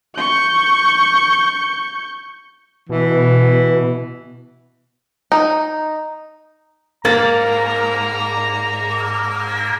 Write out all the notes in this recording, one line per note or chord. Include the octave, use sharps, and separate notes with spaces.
C#6 G6
B2 E3
D#4
G#2 A#3 A#4 A#5 A6 F#7